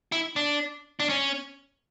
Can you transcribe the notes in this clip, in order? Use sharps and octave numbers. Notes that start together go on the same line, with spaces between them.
E4
D4
D4
C#4